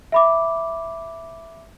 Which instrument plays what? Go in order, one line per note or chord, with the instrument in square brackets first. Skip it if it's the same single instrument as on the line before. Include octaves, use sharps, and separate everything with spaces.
[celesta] E5 B5 D6